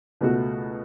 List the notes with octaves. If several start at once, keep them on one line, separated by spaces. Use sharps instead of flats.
C#2 B2 A3 F#4